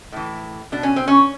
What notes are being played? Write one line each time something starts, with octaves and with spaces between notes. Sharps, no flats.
A2 E3
B2 D4
C#4
C4
C#4